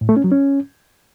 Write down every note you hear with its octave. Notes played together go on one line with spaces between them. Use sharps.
A2
A3
C#4
F#3
C#4